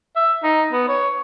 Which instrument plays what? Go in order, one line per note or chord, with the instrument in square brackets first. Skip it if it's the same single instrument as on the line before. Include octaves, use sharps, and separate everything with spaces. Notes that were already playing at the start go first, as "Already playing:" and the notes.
[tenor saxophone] E5
D#4
B3
C#5